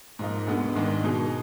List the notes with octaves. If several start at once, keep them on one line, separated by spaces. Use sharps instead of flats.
G#2 F3 A#3 D#4
D2 D3 G#3 B3
G#2 D#3 G#3 D4
B2 G#3 D#4 G#4